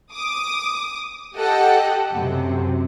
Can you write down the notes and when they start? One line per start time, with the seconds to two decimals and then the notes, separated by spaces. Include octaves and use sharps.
0.12 D6 D#6
1.36 G4 A4 D#5 F#5 G5
2.14 F#2 C3